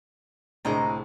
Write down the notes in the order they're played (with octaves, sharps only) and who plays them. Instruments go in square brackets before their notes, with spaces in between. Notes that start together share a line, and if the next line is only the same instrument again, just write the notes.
[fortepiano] C2 A2 D3 [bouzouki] G#3 D#5 A#5